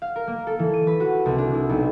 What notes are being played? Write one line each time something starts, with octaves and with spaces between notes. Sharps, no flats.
F5
A#4
A#3
A4
E3
D#7
B4
F#4
C2
D4
E4
B1